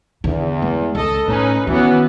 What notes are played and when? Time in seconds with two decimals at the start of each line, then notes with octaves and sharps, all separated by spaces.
0.24 E2 D3
0.62 G#3
0.95 C#2 A4 D#5
1.27 A2 C#4 D#4 B4
1.67 D#3 E3 B3 C#4 F#4